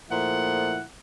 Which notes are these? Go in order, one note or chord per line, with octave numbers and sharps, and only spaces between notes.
A#2 F3 A3 E4 F#5